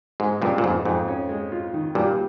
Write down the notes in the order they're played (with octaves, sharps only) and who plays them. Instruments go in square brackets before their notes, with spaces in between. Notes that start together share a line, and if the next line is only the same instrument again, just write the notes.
[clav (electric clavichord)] G#2 [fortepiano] G#3
[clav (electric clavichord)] G2 A#2 [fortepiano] C#3
[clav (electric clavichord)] A#2
[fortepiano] F2 [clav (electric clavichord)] G#2
[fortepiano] F2 [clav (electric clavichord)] G#2
[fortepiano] C#4
G#3
F4
D#3
[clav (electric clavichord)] G2 A#2 [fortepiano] G3